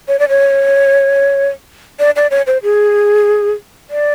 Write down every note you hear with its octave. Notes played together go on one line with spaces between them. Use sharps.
C#5
D5
C#5
D5
D5
C#5
C5
G#4
D5